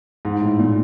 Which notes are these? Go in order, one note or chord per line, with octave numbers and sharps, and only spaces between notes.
G#2
A2
A#2